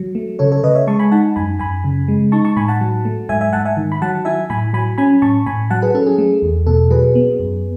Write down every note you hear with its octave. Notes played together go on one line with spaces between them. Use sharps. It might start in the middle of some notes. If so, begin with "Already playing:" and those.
Already playing: F#3
A3
C#3 A4 C#5
A4 C#5
C#3 B4 D#5
C#5 E5
G#3 A5 C#6
G#5 B5
D#4 F#5 A5
F#2 G#5 B5
F#2 G#5 B5
C#3
G#3
D#4 A5 C#6
A5 C#6
A2 G#5 B5
F#5 A5
F#3
A3
G#2 E5 G#5
E5 G#5
G#2 F#5 A5
E5 G#5
D#3
B5
F#3 F#5 A5
E4 E5 G#5
A2 G#5 B5
F#3 G#5 B5
C#4 G#5 B5
A2 A5 C#6
A2 G#5 B5
F#3 F#5 A5
G#4 B4
C#4 A4
G#4
A3
E2
B2 A4
F#3 G#4 B4
B3
F#2